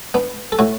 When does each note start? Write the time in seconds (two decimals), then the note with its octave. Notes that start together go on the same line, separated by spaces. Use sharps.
0.14 B3 D4
0.52 A4
0.59 A2 F#4